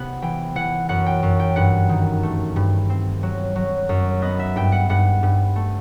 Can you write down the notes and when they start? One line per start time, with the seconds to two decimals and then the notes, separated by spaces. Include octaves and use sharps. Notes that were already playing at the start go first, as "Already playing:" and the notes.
Already playing: C3 B3 F#5
0.22 E3 G5
0.55 E3 F#5
0.89 F#2 F#5
1.06 G5
1.23 F#2
1.40 G5
1.56 G2 F#5
1.89 D#3
2.23 A3
2.56 G2
2.90 C4
3.23 F#3
3.55 F#3
3.89 F#2
4.22 B3 D#5
4.39 E5
4.56 G2 G5
4.72 F#5
4.89 G2 F#5
5.23 G2
5.56 A3